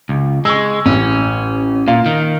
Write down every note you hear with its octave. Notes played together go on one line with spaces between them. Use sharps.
C#2
G#3 C#6 E6
A1 C#4
A#2 F5
D#3